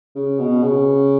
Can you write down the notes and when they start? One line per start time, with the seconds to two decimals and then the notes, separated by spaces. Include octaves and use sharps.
0.16 C#3
0.40 B2
0.62 C#3